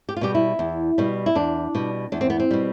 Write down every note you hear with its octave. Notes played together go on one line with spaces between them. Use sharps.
G4
F4
B2 G3 G4
E4
E2
B2 G3
E4
E2 D4
B2 G3
E2 D4
C4
B3
C4
B2 G3